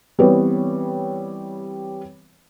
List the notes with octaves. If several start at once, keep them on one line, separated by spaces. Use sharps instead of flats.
E3 G3 B3 C4 B4 C#5